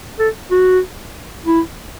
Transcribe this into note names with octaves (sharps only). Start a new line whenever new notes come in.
A4
F#4
E4